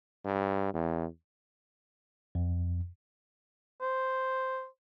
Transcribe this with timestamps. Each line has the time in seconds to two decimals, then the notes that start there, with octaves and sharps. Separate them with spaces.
0.25 G2
0.74 E2
2.35 F2
3.82 C5